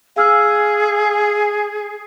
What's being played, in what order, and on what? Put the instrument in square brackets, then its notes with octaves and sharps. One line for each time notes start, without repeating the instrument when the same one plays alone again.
[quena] G#4 [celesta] F5 E6 F6